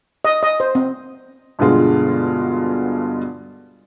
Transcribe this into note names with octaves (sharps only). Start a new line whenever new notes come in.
D#5
D#5
C5
C4
G2 B2 D3 G#3 F4 F#4